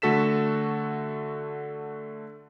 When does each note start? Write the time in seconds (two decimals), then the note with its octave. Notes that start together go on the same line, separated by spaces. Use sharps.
0.02 D3 A3 F#4 A4 B6 E7